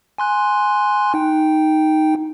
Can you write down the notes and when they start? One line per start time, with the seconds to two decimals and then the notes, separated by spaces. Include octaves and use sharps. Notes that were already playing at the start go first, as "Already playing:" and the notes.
0.18 G#5 C6 F#6
1.14 D#4 G5